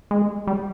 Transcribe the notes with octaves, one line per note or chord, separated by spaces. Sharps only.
G#3
G3